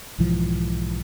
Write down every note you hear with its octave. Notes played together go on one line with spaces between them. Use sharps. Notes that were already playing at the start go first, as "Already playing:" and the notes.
B1 G#2 E3 F3